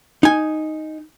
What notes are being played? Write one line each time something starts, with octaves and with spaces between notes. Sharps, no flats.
D#4 G#5